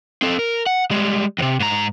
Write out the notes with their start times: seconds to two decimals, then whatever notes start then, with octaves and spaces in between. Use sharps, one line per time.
0.22 C4 A4
0.39 A#4
0.66 F#5
0.91 G3 G#3
1.38 D#2 C3
1.60 G#2 A#5